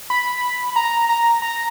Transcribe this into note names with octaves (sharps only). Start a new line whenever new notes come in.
B5
A#5
A#5
A#5